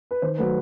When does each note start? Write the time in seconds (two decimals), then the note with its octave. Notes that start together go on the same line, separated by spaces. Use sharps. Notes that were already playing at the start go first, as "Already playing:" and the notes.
0.11 B4
0.22 D#3 C5
0.38 F#3 A3 B4